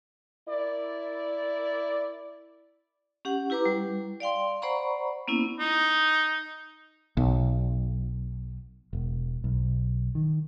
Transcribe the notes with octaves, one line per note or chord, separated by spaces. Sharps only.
E4 A#4 D5
C#4 G4 F#5
E4 G4 B4 A#5 D6
G3
D5 F5 G5 C6
C5 D5 F#5 A#5 B5 C#6
A#3 B3 C#4 E4
D#4
B1
E1
B1
D#3